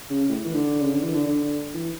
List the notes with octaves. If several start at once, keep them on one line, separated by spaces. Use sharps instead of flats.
C#3
A2
E3
D3
C#3
D3
E3
D3
D3
E3